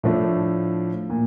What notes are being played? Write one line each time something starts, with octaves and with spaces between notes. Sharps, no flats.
A2 F3 A3 D4
A#2